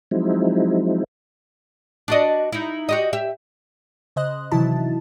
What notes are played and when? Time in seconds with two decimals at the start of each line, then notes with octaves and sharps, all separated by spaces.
0.11 F3 F#3 G#3 C4 D#4 E4
2.08 D4 F#4 D#5
2.52 D#4 E4
2.89 F#4 G4 D#5
3.13 G4 E5
4.16 C#3 C5 D#5 F#6
4.52 C3 D#3 E3 F#3 E4 A5